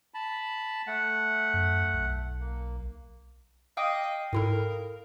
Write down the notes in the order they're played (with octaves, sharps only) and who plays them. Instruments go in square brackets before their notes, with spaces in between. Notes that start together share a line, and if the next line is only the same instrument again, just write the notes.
[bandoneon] A5 B5
A3 F#5
[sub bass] F#2
B1
[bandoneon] A#3
[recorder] D#5 [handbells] F5 G5 D#6 [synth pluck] D6
[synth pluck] G#2 E4 A4 [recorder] A#4